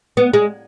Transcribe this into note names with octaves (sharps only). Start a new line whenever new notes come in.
B3
G#3